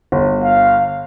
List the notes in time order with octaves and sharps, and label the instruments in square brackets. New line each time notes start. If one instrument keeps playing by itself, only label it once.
[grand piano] G1
[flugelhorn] F5